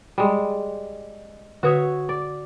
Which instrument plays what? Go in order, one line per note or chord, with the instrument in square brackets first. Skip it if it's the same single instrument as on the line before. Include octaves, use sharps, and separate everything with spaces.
[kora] G3 G#3
[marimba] D3 B4 D#6 [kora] F#4 C#5 E5
[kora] D5